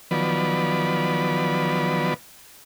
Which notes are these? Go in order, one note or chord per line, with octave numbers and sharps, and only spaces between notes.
D#3 F3 F#3 B3 B4 D5